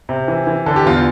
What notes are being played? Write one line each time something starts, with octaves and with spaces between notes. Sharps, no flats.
C3
E3
E3
D3 A4
G4
E2 F4